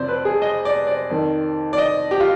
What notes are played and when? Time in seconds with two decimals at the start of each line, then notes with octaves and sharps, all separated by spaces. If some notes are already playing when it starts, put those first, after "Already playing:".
Already playing: F2 C3 F3 C5 D5
0.08 B4
0.25 G#4
0.42 D#5
0.65 D5
0.87 D5
1.10 F2 D#3
1.73 D5
1.78 D#5
2.11 G4
2.20 F4